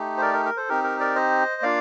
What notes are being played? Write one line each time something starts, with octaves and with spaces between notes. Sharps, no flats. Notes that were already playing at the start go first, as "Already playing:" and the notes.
Already playing: A3 D#4 G4
C5
A#4 D5
A#4
A#4
A4 C5
C4 D#4 G4 A#4
A#4
A#4 D5
C5 D#5
A#3 D4 F4 D5 F5